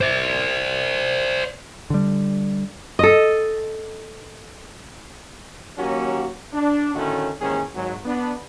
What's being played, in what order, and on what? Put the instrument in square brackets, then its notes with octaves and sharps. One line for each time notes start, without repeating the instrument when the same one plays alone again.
[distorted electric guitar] C5 D5
[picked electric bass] D3 G3
[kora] A4 D#5
[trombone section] D#2 F#3 A#3 C#4 F#4 G4
D4
A2 D3 D#3 A3 C#4 F#4
D#2 G#2 D#3 E3 C#4 G#4
G#1 G#2 F#3
B3 D4